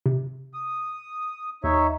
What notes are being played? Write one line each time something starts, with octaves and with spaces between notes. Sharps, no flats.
C3
D#6
D#2 D#4 C#5 E5